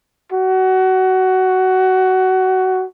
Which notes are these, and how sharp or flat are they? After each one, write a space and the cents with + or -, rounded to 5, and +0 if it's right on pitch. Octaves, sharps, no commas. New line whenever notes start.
F#4 +20